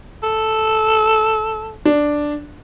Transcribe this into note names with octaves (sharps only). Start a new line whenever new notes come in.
A4
D4